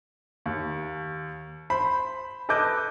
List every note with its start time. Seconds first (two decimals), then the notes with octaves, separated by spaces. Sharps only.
0.46 D#2
1.70 C5 B5
2.49 A4 B4 D#5 D6 G6